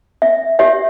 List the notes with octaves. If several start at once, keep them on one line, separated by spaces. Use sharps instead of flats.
E5
G4 C#5 E5